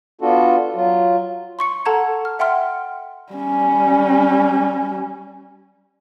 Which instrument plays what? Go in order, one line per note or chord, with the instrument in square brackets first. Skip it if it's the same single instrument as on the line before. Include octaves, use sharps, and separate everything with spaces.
[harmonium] B3 D4 F4 F#4 A4
F#3 F4
[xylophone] C6 C#6 C#7
A4 F#5 A5 A#5 G#6
F6
E5 F#5 G5 C6 F6
[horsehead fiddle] G3 C#4